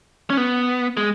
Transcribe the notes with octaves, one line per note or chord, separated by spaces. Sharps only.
C#4
B3
G#3